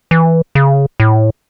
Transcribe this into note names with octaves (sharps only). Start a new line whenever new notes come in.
E3
C#3
A2